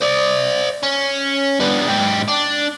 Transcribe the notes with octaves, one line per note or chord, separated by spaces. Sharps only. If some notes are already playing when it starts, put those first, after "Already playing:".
C5 D5
C#4
B3 D4
G#2 G4
D4